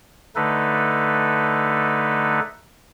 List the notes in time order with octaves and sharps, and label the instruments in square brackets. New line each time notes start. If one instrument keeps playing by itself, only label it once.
[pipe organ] D3 A3 D#4 A4 B4